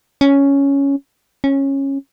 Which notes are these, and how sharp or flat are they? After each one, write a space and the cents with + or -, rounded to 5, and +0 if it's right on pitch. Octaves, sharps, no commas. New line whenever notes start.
C#4 +5
C#4 -15